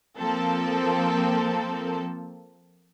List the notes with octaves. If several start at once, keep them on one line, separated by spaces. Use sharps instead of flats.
F3 A#3 C4 A4